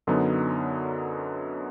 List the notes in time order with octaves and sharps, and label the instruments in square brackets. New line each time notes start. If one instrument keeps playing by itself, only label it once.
[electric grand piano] F#2 D3 F#3 B3 D#4